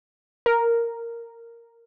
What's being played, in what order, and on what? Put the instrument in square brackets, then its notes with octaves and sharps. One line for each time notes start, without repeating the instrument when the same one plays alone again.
[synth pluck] A#4